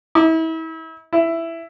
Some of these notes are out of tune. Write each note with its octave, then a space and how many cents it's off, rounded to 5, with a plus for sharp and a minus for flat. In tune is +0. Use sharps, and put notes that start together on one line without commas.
E4 -35
E4 +10